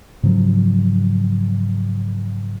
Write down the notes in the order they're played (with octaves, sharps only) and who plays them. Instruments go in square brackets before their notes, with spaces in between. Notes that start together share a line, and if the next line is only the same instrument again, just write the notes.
[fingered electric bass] G#2 C#3 F3 F#3